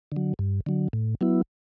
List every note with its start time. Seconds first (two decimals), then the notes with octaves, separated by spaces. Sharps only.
0.12 D3 F#3
0.39 G2
0.66 D3 F#3
0.93 A2
1.21 F#3 B3 E4